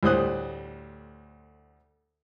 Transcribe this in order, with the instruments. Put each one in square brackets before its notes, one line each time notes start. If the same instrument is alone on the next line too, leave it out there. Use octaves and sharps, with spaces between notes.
[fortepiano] D2 A2 G3 C5 D#6 F#6